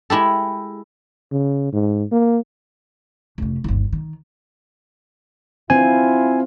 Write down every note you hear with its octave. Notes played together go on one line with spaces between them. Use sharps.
G#3 E4 G4 A4
C#3
G#2
A#3
F1 C#3
G1 D#2
D#3
C4 E4 F4 G#5